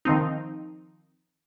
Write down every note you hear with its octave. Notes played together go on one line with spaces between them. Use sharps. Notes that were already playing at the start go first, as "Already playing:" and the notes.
D#3 F3 C4 D#4